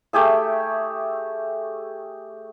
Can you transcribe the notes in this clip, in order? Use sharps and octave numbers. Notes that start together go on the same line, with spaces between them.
A3 G4 G#4 E5